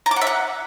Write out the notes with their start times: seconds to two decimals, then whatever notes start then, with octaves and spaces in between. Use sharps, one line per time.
0.06 A#5
0.11 D6
0.16 F#5
0.21 E5
0.27 F#5